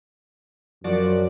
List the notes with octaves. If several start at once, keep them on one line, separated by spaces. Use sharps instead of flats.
F#2 F3 F#4 D5